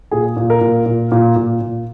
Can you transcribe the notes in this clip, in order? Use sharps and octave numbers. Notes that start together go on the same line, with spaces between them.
A#2 G#4
A#2
A#4
A#2
A#2
A#2
A#2
A#2